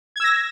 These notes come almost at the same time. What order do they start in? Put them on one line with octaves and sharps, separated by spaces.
G#6 E6 A#6